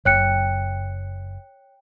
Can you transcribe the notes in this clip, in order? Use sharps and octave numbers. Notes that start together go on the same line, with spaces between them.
F#1 C#5 G5 F#6 C#7